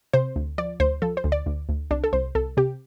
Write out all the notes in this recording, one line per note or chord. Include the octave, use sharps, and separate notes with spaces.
C3 C5
D2
F3 D5
D2 C5
F3 A4
C5
D2
D5
D2
D2
C2 D4
A4
C2 C5
C2 A4
C3 G4